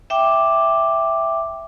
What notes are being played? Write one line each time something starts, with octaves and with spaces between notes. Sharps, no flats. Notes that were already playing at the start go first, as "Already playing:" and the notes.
E5 G5 D6